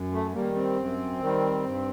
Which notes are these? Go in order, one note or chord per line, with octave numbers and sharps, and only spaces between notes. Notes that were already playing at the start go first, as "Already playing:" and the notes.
Already playing: F#2
A3
D#3 G3 A#3
C4
F#2
D#3 G3
G2